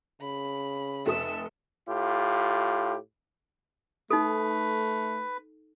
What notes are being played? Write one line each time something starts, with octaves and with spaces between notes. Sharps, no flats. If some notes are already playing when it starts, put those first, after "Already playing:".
C#3 B5
F1 A4 E5 D#6 E6
A2 F4 G4
A3 D#4 A4 B4